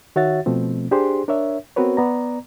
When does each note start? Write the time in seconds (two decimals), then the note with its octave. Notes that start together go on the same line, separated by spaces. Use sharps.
0.16 D#3 F#4 C#5 E5 F#5 A6
0.46 B2 F3 A3 C4
0.91 D4 G4 G#4 C5 C6
1.28 D4 A#4 C#5 E5
1.76 B3 C4 F#4 A#4 B4 C#5
1.97 B3 D5 A#5